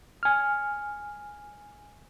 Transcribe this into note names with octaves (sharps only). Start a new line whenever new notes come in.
G#5 F6